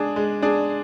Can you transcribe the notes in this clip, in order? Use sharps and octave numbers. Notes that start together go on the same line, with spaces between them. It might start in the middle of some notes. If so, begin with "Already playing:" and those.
Already playing: G#3 D4 G#4
G#3
D4 G#4